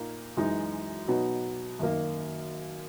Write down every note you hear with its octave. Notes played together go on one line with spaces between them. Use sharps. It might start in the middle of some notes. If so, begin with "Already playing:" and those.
Already playing: A#2 A#3 D#4
F#2 E3 G#3 D#4
B2 F#3 B3 D#4
F#2 D#3 A#3